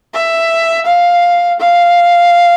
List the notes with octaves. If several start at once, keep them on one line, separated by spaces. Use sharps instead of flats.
E5
F5
F5